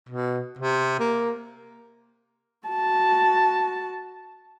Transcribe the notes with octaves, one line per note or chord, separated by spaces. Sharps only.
B2
C3
A#3
F#4 A5